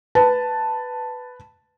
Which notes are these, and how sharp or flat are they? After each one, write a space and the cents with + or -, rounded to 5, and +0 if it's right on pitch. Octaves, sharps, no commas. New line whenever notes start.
B4 +5 A5 +5